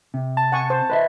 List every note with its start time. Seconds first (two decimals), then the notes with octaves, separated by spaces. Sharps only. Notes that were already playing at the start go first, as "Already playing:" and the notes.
0.14 C3
0.37 A5
0.52 F#5 G#5 C#6
0.70 C5
0.90 B4 D#5 E5